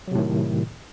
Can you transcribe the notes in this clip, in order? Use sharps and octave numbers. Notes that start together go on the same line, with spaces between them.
A2 C3 D#3 F#3